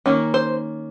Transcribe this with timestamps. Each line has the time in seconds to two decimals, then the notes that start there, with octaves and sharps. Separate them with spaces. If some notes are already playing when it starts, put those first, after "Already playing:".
0.06 D#3 A#3 C#4
0.34 C5